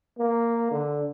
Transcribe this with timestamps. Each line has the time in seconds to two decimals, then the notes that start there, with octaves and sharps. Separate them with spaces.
0.18 A#3
0.71 D3